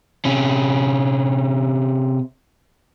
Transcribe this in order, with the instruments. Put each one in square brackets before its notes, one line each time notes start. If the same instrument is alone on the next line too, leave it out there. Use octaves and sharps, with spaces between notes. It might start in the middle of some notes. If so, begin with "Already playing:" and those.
[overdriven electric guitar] C3 C#4